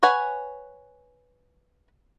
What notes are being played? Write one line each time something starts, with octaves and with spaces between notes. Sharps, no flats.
B4 C#5 F#5 G#5